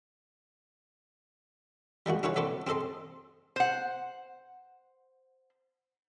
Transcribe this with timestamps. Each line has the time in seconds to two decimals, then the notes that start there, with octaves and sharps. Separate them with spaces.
2.06 G3 G#3 A#3 F#4
2.23 D4 E4 F#4 G#4 B4 C#5
2.36 B3 C4 A4 D5 E5
2.67 C4 G#4 A4 D#5 C6
3.56 C5 F#5